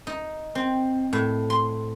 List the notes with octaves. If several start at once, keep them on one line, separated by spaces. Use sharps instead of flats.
D#4
C4
A2
C6